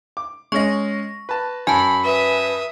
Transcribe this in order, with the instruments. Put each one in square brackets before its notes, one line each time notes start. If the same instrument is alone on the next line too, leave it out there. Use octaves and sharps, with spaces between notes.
[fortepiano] D6
[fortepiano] G#3 C#4 D#5 [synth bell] C#6 A#6
[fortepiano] B4 A5
[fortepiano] F#2 [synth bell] G#5 A5 [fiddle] B5
[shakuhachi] B4 [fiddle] E5 D#6